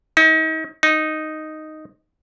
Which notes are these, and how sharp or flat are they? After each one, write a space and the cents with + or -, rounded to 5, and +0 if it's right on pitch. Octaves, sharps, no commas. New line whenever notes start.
D#4 +35
D#4 -5